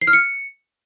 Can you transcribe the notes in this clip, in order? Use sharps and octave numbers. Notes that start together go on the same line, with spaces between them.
C7
F6
C#7